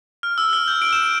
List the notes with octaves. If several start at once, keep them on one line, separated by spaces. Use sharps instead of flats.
F6
E6
F6
G6
D7
E7
D7